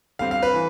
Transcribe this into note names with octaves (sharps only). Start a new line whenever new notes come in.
D3 G3 C4 F5
F5
B4
E3